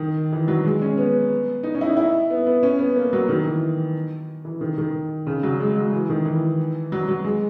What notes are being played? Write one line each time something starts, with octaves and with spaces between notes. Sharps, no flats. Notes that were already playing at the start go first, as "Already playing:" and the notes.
Already playing: D#3
E3
F#3
G#3
C#4
B3
D#4
C#4
E4
D#4
E4
B3
B3
C#4
B3
A#3
F#3
D#3
E3
E3
D#3
D#3
C#3
F#3
G#3
F#3
E3
D#3
E3
F#3
F#3
G#3